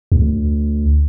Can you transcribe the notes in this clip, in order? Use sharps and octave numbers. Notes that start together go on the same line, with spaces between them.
D2